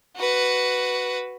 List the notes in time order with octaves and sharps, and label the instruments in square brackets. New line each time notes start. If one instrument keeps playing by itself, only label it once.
[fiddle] F#4 B4